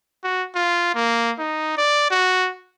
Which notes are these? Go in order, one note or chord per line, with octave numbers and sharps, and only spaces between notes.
F#4
F4
A#3
D#4
D5
F#4